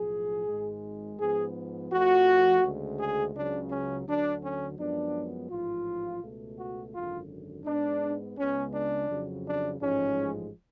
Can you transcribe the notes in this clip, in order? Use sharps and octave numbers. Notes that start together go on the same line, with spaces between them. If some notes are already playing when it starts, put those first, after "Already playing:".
Already playing: B1 A2 F3 G#4
G#1 G#2 G#3
G#2 F3 B3 G#4
F2 F3 A3 F#4
D2 C#3 G#3
G#4
C#2 C#3 F#3 D4
C#4
D2 D3 F#3 D4
C#4
F#2 F3 G#3 B3 D4
A1 G#2 F3 F4
C#2 B2 A3
F#4
G#1 F#2 D3 F4
G#2 G#3 B3 D4
C#2 C#3 G#3 B3 C#4
D4
F2 C#3 F#3
D4
A1 G#2 F3 G#3 C#4